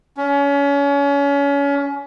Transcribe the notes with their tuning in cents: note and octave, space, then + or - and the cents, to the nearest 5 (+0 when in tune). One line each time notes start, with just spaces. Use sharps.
C#4 +30